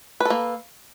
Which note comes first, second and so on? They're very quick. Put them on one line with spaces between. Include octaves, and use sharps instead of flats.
B4 A4 A#3